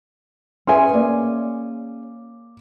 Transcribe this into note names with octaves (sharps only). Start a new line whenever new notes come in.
C#4 G#4 B4 E5 G#5 C6
A#3 D5